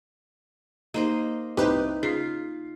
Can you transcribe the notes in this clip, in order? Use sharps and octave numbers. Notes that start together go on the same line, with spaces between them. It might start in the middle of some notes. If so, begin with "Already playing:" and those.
A#3 D#4 G4 C5 D#5
C2 D#4 G4 B4 C5
C#3 F4 B6 C7